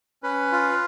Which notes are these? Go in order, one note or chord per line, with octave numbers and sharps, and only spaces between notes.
C#4 B4
F4